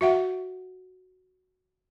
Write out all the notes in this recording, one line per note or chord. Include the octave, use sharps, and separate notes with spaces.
F#4 E5 F#5